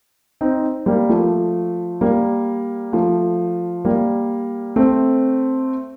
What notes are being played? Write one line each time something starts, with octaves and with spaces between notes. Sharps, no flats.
C4 D#4
G3 A#3
F3 A3
G3 A#3
F3 A3
G3 A#3
A3 C4